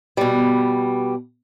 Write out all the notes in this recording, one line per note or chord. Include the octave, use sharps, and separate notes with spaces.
B2 G3